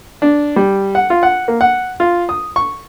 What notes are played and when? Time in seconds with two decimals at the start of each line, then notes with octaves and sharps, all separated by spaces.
0.22 D4
0.56 G3
0.95 F#5
1.10 F4
1.23 F#5
1.48 A#3
1.61 F#5
2.00 F4
2.29 D#6
2.56 C#6